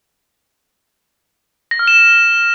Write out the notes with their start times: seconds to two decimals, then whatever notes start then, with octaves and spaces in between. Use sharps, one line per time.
1.71 A#6
1.79 F6
1.87 E7